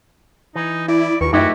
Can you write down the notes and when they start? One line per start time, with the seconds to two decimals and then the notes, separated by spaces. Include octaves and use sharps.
0.56 E3 D#4
0.88 E4 D5
1.21 D#2 F4 B4 C#6
1.33 F#2 A3 D#4 E4 F#4 G4 D#5 E5